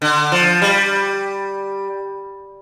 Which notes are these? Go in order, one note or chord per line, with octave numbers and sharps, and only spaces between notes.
D3
F3
G3